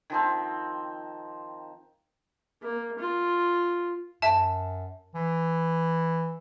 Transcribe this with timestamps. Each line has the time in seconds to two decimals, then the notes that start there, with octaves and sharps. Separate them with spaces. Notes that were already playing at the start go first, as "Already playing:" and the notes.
0.10 D#3 F3 C4
2.62 A#3
2.99 F4
4.22 F#2 E5 A5
5.14 E3